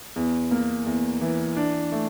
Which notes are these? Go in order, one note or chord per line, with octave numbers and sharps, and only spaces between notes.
E2
A#3
E2
E3
D4
A3